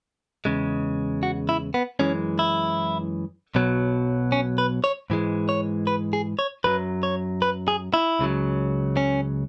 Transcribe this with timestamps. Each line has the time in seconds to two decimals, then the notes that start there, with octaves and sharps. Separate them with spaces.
0.45 E2 C#3 G#3
1.23 F#4
1.49 E4
1.74 B3
1.99 F#2 E3 G#3 C#4
2.39 E4
3.55 B1 B2 F#3
4.32 C#4
4.58 B4
4.84 C#5
5.10 G#2 E3 G#3
5.49 C#5
5.87 B4
6.13 G#4
6.39 C#5
6.64 F#2 F#3 B4
7.03 C#5
7.42 B4
7.68 G#4
7.94 E4
8.19 C#2 C#3 F#3
8.97 C#4